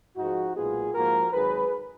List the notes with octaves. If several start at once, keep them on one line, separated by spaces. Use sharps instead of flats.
G#2 F3 G#3 D#4 F#4
B1 A#2 G#3 B3 F4 G#4
G#2 F3 A#3 F#4 A#4
G#1 G#2 F#3 G#4 B4